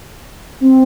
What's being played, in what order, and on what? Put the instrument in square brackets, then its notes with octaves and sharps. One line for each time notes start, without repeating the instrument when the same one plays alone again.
[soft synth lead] C4